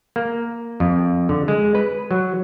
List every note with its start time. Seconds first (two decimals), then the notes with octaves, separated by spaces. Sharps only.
0.16 A#3
0.80 F2
1.29 D3
1.48 G#3
1.75 B4
2.11 F#3